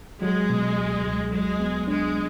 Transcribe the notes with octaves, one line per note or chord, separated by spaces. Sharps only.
F#3 G#3
B2
C#2
C#2
F#3 G#3
B3
G#3 D4